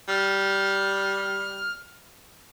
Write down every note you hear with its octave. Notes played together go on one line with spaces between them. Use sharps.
G3 F6